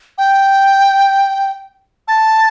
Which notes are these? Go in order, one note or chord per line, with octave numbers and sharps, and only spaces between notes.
G5
A5